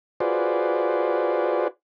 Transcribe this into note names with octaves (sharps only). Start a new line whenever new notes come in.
F4 F#4 G#4 B4 C5 D5